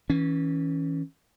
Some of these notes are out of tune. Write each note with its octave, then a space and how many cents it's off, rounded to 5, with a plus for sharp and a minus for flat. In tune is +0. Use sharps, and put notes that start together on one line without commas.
E3 -25 C#4 +0